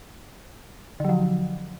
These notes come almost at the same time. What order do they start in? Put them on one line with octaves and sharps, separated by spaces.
D3 F#3 F3